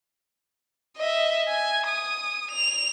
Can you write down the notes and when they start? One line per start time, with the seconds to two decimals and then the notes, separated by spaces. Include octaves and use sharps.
0.97 D#5 E5
1.48 G#5
1.87 D#6
2.51 F7